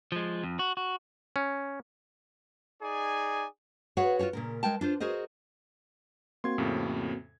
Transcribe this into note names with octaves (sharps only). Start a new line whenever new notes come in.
F3 G#3
F2
F#4
F#4
C#4
D#4 G#4 D5 G#5
F#4 G#4 B4 C#5 F5 F#5
F4 F#4 G#4 C#5
A#2 C#3 A#4
G#3 A#4 G5 A5
D4 F4 C5
F#4 G#4 A#4 C5 D#5
A#3 C4 F#4 C6 G#6
F2 A2 C#3